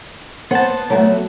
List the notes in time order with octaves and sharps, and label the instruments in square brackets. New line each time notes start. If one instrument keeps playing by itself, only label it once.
[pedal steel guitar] B3 A5 [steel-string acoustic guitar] C5 F#5
[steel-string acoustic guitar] F#3 A3 F#4